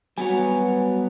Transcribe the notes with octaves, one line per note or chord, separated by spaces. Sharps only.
F#3 G3 B3 F#4 B4 C#5 G#5